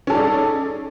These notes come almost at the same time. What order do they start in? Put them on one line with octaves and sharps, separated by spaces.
C#4 A4 D#4 D5 G#4